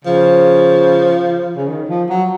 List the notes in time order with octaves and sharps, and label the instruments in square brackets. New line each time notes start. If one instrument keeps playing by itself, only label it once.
[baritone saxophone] C#3 [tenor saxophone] F3
[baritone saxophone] C#3
D#3
F3
F#3